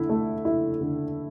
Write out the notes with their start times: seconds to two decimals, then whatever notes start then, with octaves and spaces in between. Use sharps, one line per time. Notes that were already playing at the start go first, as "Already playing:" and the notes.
Already playing: D3 E4
0.09 A3
0.45 E4
0.81 D3